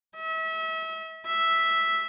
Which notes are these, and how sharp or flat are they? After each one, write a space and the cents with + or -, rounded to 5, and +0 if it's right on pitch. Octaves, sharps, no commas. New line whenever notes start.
E5 -35
E5 -5